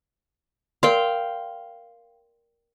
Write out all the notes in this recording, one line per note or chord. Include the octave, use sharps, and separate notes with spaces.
A#4 D5 F5 G5 C6